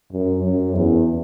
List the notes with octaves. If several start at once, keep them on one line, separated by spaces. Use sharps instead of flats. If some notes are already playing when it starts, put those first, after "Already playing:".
F#2
F#2
E2